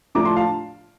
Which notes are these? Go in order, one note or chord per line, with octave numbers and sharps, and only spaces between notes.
A2 F3 A3 D4 A#5 D6
A5 C6
F5 A5